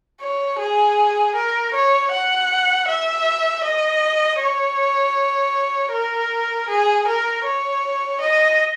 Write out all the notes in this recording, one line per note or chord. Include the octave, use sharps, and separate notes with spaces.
C#5
G#4
A#4
C#5
F#5
E5
D#5
C#5
A#4
G#4
A#4
C#5
D#5